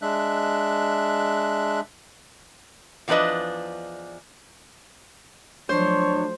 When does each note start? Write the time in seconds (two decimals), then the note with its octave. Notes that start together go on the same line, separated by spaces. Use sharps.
0.02 G#3 D4 E5 F#6
3.08 E2 F3 C4 D4 B4 D#5
5.69 F3 F#3 A3 D4 C5 C#5